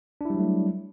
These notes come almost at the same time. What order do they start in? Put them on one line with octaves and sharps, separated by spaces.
D4 E4 G3 F#3 A3